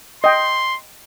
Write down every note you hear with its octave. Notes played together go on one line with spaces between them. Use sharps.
D#5 G5 C6